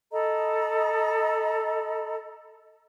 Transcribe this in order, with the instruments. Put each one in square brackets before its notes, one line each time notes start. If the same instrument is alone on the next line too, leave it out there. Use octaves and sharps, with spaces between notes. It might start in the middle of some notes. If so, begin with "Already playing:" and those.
[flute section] A4 D#5 A#5 B5